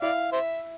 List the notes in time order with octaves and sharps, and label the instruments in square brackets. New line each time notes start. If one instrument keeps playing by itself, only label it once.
[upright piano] E4 [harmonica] D5 F5
[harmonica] C5 E5